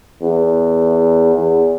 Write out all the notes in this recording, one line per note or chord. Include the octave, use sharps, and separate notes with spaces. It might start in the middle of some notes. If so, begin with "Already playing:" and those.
E2
E2